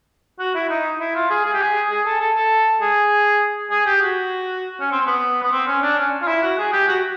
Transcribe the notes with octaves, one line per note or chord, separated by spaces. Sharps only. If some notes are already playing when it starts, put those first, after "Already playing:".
F#4
E4
D#4
E4
F4
G#4
G#4
G4
G#4
G#4
A4
A4
A4
G#4
G#4
G4
F#4
C#4
C4
C4
B3
B3
C4
C#4
D4
C#4
F4
E4
F#4
G#4
G4
F#4